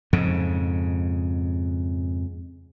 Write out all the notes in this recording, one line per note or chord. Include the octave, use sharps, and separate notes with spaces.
F2 G#2 C#3